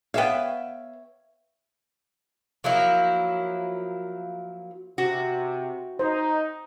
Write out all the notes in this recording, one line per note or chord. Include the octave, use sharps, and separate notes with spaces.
B3 C#5 E5 F5 G5
F3 F#3 A#3 E4
C3 F#4
D#4 C5